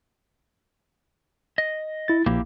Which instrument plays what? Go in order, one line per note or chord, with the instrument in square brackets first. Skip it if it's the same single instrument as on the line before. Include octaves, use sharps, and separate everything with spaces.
[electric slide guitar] D#5
[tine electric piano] E4 A6
[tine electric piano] A#1 [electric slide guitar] A#3 E4 G4